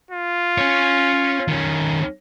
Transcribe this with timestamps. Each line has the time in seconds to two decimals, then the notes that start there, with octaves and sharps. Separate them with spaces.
0.11 F4
0.58 C#4 C#5
1.48 D#3 C#4